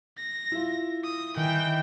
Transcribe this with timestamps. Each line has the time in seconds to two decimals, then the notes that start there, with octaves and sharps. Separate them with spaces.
0.17 A#6
0.52 E4 F4
1.04 D#6
1.36 D#3 E3 G5